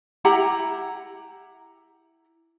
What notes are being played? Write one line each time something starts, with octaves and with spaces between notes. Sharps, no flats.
E4 G4 F#5 A#5